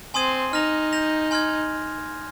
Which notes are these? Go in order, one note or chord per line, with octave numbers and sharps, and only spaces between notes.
C4 G#5 C6 D#6 G#6 D#7
D#4 F6 A#6 F7
G6 A#6 F7
G#5 C6 F6 G#6